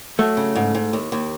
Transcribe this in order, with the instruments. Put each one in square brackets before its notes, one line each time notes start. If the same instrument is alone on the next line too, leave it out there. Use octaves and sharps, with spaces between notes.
[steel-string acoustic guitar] F#3 [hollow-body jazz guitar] A3
[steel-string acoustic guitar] C#3
G#2
G#2
D#2
D#2